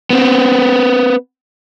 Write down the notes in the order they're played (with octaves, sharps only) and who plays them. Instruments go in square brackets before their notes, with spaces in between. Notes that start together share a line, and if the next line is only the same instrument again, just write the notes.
[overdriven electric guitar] B3 C4